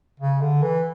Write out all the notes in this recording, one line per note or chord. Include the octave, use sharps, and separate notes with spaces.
C#3
D3
E3